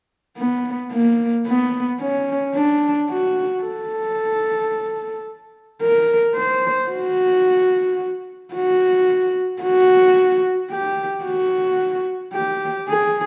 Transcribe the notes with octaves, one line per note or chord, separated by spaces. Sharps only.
B3
A#3
B3
C#4
D4
F#4
A4
A#4
C5
F#4
F#4
F#4
G4
F#4
G4
G#4